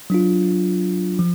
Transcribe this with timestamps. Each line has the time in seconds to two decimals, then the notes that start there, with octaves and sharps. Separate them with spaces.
0.10 F#3 D4 F4
1.19 F3